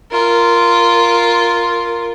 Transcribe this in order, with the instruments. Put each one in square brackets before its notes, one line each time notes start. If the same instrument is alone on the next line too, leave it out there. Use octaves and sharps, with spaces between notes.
[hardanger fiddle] F4 A#4